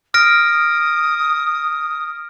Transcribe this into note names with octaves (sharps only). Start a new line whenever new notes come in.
D#6 F6 A#6 D7